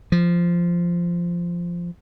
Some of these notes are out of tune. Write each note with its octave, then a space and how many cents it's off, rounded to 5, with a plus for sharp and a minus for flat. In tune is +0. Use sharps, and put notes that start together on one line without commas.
F3 -10